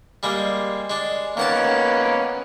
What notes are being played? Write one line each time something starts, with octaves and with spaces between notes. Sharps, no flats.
G3 G#3 A#3
G#3 D4
D#3 A#3 B3 C#4 F#5 A5